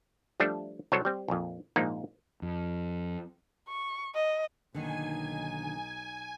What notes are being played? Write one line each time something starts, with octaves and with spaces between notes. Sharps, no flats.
F3 G3 A3 D4 A4
C2 F#3 A4 C5 C#5
G3 C4
A#1 F2
A#1 G#2 F3 A#3 D#4 A#5
F2
C#6
D#5
B1 D3 D#3 A#3 D#4 G#5